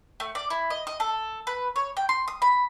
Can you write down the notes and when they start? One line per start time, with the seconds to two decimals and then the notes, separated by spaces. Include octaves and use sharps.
0.20 A3
0.35 D5
0.50 E4
0.70 D#5
0.87 D#5
1.00 A4
1.47 B4
1.76 C#5
1.97 G5
2.09 C6
2.28 D#6
2.42 B5